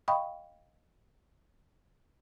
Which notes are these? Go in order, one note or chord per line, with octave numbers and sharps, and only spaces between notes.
D#5 F5 G5 B5 C#6 D#6